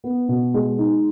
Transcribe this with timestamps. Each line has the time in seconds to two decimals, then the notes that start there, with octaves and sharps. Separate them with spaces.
0.04 B3
0.28 B2
0.54 G#3
0.78 D#4